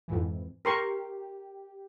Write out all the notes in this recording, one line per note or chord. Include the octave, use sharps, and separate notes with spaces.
F2 G#2 E3
G4 A#4 C6 C#6